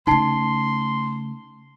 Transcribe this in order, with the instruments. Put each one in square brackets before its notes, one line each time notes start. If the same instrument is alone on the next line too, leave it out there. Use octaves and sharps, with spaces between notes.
[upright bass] C#3 A3 [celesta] D#4 A5 C7 [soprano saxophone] C6